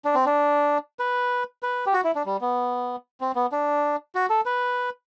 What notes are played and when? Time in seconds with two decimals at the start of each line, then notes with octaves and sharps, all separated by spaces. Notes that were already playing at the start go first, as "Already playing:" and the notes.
0.05 D4
0.15 C4
0.26 D4
0.99 B4
1.63 B4
1.86 G4
1.94 F#4
2.04 E4
2.15 D4
2.26 G3
2.41 B3
3.21 C4
3.35 B3
3.52 D4
4.15 F#4
4.30 A4
4.46 B4